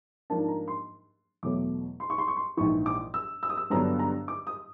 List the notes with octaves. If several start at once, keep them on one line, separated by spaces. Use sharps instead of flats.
G#2 F3 A#3 D4 A5
A#5
C6
E2 B2 F#3 A3 D6
C6
C#6
C6
C#6
C6
A#1 G#2 E3 C#6
D6
E6
E6
D#6
E6
G2 D3 F#3 B3 D4 A#5
A#5
D6
D#6